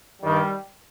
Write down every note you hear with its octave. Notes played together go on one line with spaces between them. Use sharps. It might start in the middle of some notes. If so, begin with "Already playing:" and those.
G2 D#3 G3